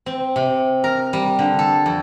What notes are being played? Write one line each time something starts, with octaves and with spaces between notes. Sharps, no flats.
C4
C3
A#4
G3
D3
A4
F2